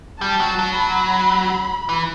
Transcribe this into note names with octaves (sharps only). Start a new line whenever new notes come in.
G3 A5
F#3
F#3
B5
E3